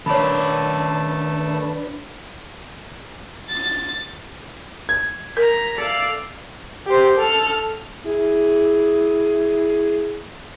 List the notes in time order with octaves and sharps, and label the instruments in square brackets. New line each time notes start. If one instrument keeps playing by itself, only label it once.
[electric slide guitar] D#3 D5 [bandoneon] A3 A5 [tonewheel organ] D4 B4 [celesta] C#5 B5
[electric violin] A6
[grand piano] G#6
[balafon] A#4 [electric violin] A#5 B6
[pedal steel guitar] A4 E5 [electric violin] D5 F5
[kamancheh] G4 C5
A4 F6
[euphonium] E4 [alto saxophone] G#4